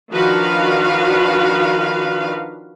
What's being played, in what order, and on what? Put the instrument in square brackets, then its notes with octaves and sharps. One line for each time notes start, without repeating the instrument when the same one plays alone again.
[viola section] D#3 F3 D4 F#4 B4 F5